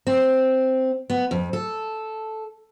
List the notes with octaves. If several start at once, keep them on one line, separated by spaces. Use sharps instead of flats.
C4
B3
F2
A4